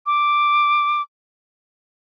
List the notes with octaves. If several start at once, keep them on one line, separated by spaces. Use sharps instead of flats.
D6